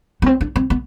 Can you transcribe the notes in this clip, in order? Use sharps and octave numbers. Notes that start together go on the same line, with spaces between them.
B3
C4
D4
C4
B3